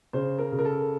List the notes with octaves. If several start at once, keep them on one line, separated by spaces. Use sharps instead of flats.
C#3 C5
A#4
C#3
A#4
A4